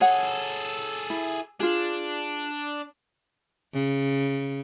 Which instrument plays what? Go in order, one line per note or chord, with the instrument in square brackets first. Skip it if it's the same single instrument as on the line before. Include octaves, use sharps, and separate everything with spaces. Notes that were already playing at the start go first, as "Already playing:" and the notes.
[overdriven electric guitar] G#4 A4 [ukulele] C#5 F#5
[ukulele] E4
[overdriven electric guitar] D4 [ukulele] F4 G#4
[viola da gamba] C#3